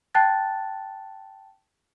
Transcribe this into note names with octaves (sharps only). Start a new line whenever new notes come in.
G5 A5 F#6 A6